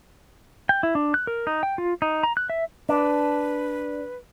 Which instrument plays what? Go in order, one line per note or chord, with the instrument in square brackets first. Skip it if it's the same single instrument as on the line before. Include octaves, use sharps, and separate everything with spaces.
[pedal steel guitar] G5
E4
D4
F#6
A#4
D#4
G5
F4
D#4
A#5
F#6
E5
[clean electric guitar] D4 [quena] B4